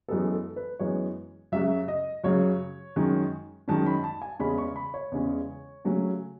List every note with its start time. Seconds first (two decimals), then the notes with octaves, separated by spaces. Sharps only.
0.08 F#2 E3 G#3 B3 A4
0.32 A4
0.56 B4
0.79 F#2 E3 G#3 B3 C#5
1.52 F#2 C#3 F#3 E5
1.88 D#5
2.24 F#2 C#3 F#3 C#5
2.96 F#2 D#3 G#3 C#4
3.68 F#2 D#3 G#3 C#4 A5
3.86 B5
4.04 A5
4.22 G#5
4.40 E2 C#3 G#3 C#4 B5
4.58 C#6
4.76 B5
4.94 C#5
5.12 E2 C#3 G#3 C#4
5.85 C#3 F#3 A3 C#4